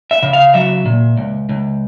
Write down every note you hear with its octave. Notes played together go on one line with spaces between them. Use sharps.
E5
C#3
F5
F#3 E5
A#2
C#2
C#2